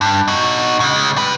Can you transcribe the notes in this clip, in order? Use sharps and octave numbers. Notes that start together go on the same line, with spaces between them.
G2
D#4 F#4
C#3 G#3
G3 B4